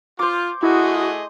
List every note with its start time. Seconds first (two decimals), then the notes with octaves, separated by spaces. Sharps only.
0.19 F4 C5 D6
0.63 A3 E4 F#4 G#4 D#5